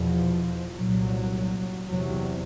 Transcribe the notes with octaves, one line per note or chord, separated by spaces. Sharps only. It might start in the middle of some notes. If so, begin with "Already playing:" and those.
Already playing: E2 B2 F3
C2 A#2 F#3
E2 C3 F#3